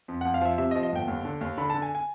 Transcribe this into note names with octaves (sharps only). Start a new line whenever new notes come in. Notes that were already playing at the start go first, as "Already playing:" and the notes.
F2
F2 F#5
F5
F3 E5
C3 E5
D#5
F3
D#5
G1 G5
D#2
D3
D#2
D3 B5
D3 A5
G#5
G#5